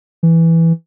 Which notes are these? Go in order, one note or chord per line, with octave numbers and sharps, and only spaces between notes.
E3